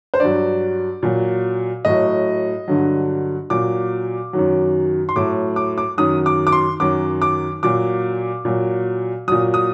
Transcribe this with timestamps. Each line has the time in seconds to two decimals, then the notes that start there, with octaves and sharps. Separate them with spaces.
0.14 C5
0.20 G2 F#3 D5
1.03 A#2 F#3
1.85 A2 F#3 D#5
2.68 G2 D3 F#3
3.50 A#2 F#3 D6
4.33 F#2 D#3 F#3
5.09 C6
5.16 A2 F#3 D6
5.56 D6
5.78 D6
5.98 F#2 D#3 F#3 D#6
6.26 D6
6.47 D6
6.52 C6
6.80 F#2 D#3 F#3 D6
7.22 D6
7.63 A#2 F#3 D6
8.45 A#2 F#3
9.28 A#2 F#3 D#6
9.54 D#6